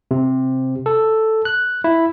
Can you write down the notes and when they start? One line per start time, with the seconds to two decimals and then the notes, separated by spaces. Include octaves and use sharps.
0.11 C3
0.86 A4
1.45 F#6
1.84 E4